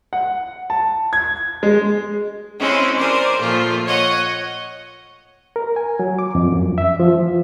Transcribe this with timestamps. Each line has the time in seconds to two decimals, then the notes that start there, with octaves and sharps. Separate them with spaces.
0.13 F#5
0.70 A5
1.13 G#6
1.63 G#3
2.59 G#3 C4 C#4 E4
2.97 G#4 A#4 C5 D5
3.40 A#2 F3 A3 F4
3.86 C#5 D#5 F#5
5.56 A#4
5.76 G#5
6.00 F#3
6.19 D6
6.35 F2
6.52 F#2
6.78 E5
7.00 F3
7.15 E3